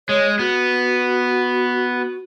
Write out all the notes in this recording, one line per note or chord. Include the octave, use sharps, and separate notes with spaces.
G#3 C#5
B3 F#4